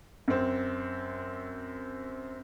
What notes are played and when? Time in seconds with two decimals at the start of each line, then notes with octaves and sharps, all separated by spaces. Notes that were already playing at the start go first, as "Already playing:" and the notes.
0.28 F#2 C4